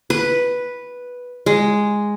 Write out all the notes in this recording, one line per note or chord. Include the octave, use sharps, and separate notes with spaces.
B4
G#3